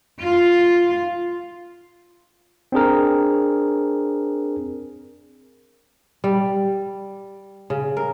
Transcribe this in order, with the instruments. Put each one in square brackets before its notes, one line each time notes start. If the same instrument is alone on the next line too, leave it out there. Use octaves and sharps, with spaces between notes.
[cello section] F4
[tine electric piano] C4 D4 G#4 A#4
[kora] G3
C#3
A#4